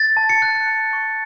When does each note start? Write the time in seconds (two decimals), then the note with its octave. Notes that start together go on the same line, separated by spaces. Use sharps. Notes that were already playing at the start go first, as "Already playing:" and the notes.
Already playing: A6
0.17 A5
0.29 C#7
0.42 F#6
0.67 A5
0.93 C#6